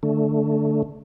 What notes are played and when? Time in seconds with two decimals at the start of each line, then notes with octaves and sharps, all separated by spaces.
0.03 D3 A3